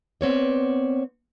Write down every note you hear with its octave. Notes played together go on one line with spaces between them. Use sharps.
B3 C4 C#5 D5